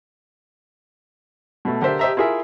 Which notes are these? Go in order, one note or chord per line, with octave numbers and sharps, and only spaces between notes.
B2 A3
D3 G4 A#4 C5 E5
G4 C5 D#5 E5 A5 A#5
E4 F4 G#4 A#4 E5